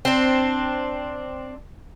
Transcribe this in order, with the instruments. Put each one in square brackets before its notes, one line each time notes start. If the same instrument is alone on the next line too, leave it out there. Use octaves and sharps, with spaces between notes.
[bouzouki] C4 D4